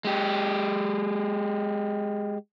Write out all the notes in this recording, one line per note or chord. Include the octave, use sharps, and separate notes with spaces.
G#3 G4